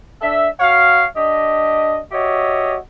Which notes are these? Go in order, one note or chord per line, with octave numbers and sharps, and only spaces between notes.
D4 A4 E5
F#4 C#5 F5
D4 G4 D#5
F#4 G4 C#5 D#5 E5